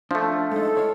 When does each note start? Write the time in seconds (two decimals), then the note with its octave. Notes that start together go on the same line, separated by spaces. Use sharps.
0.11 F3 A3 D4
0.52 G#3 D#4 A4
0.75 E4 C#5 F5